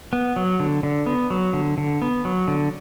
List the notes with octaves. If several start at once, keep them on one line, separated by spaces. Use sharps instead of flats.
B3
F#3
D3
D3
B3
F#3
D3
D3
B3
F#3
D3